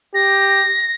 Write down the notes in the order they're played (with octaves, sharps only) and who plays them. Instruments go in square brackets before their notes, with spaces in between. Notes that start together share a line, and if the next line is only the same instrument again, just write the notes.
[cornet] G4 [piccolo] A#6